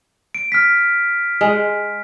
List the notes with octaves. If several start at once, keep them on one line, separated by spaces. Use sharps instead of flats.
D7
F6 B6
G#3